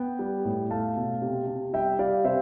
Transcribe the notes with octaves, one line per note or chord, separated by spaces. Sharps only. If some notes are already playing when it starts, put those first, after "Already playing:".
Already playing: B3 G5
G3
A2
A3 F5 A5
B2
C3
C3
G3 E5 G5
G3 D5 F5
C3 C5 E5